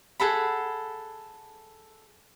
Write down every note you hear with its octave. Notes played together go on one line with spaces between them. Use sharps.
G#4 A4 F#5 B5